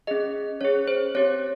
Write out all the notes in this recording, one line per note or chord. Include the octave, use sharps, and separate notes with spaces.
C#4 G#4 D#5
C#4 G#4 C#5
C5
C4 G4 C#5